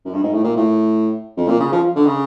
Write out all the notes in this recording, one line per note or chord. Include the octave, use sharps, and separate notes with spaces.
F#2
G2
G#2
A2
A#2
A2
F2
A#2
C#3
F3
D3
C#3